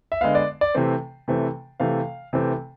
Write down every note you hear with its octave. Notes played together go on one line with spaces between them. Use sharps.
E5
D3 G#3 B3 F5
D5
D5
C3 E3 A3 C4
C3 E3 A3 C4
C3 E3 A3 C4 F5
C3 E3 A3 C4